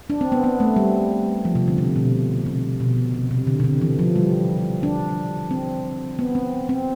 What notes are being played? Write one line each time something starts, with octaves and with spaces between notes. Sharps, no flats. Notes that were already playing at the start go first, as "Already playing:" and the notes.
D4
C4
B3
B3
A3
G3
F3
C3
D3
C3
B2
C3
B2
C3
C3
D3
C3
D3
E3
F3
G3
D4
C4
B3
C4
C4